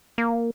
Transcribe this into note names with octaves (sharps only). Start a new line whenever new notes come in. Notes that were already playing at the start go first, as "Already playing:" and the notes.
A#3